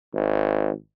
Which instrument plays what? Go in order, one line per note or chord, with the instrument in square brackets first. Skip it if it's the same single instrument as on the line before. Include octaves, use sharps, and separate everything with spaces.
[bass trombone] G#1